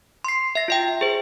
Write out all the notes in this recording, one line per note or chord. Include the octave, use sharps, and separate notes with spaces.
C6 C7
E5 A#6
F4 E5 G5
G#4 C5